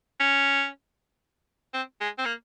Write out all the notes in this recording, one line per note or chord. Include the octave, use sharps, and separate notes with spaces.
C#4
C4
G#3
C4
A#3